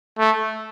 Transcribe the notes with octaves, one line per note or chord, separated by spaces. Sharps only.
A3